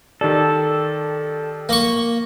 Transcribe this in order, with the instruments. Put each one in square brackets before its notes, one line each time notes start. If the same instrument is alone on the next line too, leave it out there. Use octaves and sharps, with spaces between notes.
[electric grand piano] D#3 G4 D5 [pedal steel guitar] A4
[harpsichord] A#3 C#6